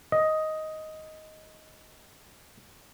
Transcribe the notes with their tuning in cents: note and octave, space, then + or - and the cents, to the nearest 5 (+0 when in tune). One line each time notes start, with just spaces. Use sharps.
D#5 +5